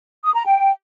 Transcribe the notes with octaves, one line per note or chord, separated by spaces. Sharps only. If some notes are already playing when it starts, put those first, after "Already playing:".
D#6
A#5
G5